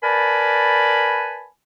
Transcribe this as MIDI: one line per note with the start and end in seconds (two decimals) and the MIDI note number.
0.03 1.46 70
0.03 1.46 71
0.03 1.46 74
0.03 1.46 80
0.03 1.46 81
0.03 1.46 83